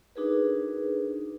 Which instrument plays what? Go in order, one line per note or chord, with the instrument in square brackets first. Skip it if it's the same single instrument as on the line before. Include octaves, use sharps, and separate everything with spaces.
[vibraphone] D4 D#4 F#4 G#4 A#4 B4